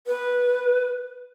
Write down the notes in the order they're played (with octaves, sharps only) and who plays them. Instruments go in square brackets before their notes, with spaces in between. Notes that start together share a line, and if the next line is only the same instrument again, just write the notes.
[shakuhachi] B4